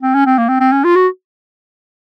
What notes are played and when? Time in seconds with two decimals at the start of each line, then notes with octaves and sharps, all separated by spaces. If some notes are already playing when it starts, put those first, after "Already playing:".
0.02 C4
0.14 C#4
0.26 C4
0.38 A#3
0.49 C4
0.60 C4
0.72 C#4
0.84 F4
0.96 F#4